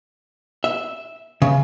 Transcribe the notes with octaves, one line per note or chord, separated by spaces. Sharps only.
E5
C#3